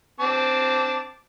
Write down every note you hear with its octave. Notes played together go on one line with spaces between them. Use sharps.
C4 A5 D6